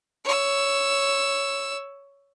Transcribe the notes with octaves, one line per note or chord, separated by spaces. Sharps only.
C#5 E6